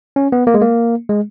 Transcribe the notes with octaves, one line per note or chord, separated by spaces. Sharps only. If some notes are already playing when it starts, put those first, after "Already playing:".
C#4
B3
A#3
G#3
A#3
G#3